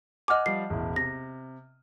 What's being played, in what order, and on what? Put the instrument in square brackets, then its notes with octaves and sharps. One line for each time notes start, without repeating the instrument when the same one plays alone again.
[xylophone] D#5 F#5 D6 [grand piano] G#5 F6 F#6
[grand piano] F3 G3 [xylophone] C7
[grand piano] E1 A1 E4
[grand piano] C3 [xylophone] A#6